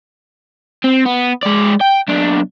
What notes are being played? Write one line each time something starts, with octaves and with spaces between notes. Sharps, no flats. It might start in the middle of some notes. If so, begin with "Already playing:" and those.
C4
B3
G#3 D5
G5
B1 D4